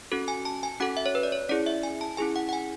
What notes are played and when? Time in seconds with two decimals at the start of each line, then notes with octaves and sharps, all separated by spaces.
0.12 C#4 F#4 A4
0.28 G#5
0.45 A5
0.63 G#5
0.80 C#4 F#4 A4 F#5
0.97 E5
1.06 C#5
1.15 B4
1.23 D5
1.32 C#5
1.49 C#4 E4 G#4 D5
1.66 E5
1.83 G#5
2.01 A5
2.17 C#4 E4 G#4 G#5
2.36 F#5
2.49 F#5
2.53 G#5